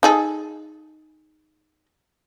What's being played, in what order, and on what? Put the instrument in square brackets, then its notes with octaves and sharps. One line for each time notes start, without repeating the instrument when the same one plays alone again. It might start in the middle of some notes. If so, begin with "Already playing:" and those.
[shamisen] D#4 G#4 A4